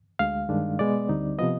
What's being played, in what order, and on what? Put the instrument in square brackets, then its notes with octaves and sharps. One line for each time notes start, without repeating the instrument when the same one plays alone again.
[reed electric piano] D2 D3 G#3 F5
G2 D#3 G#3 D4
B2 G#3 B3 D5
D2 D3 G3 C4 D#4
C3 F3 B3 D#5